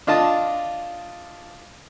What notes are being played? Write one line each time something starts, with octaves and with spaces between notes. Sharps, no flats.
D4 F4 D#5 A5